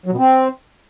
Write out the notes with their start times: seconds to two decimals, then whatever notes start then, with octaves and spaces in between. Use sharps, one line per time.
0.06 F#3
0.12 B2
0.18 C4